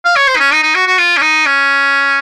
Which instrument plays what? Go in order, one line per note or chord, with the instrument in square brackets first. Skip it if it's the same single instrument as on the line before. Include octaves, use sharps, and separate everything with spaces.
[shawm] F5
C#5
C5
D#4
C#4
D#4
D#4
F#4
F#4
F4
C#4
D#4
C#4